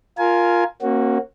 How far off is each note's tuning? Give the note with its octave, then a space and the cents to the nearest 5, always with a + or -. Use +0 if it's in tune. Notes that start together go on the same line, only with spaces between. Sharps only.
F4 +0 A#4 +0 G#5 +20
A#3 +0 C#4 -40 F#4 +0